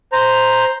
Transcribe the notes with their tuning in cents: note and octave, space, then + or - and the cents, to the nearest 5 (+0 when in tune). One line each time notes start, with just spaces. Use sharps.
C5 +0 A#5 +0